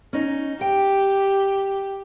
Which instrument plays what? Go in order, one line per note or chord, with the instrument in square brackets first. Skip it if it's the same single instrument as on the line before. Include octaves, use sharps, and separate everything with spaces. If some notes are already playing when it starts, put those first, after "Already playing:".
[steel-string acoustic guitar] C#4 D#4
[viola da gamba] G4 [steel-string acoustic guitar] G5